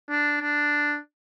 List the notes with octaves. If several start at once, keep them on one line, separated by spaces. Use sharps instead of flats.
D4
D4